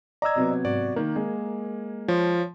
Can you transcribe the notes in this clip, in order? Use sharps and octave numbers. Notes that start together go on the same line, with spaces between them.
D5 D#5 A#5 E6 G#6
C3 F#3 B3
G#2 F#4 D5
D#3 A#3 A#4
G#3
F3 C#5